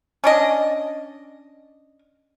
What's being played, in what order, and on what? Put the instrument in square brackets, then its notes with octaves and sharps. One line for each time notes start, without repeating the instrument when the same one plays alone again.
[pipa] C#4 D4 D#5